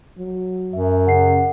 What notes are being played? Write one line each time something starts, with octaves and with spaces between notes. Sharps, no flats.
F#3
F#2 E5
C#3 F#5 C7